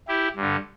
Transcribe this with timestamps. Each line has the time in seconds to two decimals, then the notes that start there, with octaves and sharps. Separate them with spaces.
0.08 E4 G4
0.36 G2 D3